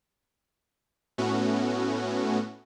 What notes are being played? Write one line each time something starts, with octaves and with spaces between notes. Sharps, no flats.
A2 A3 B3 C#4 F#4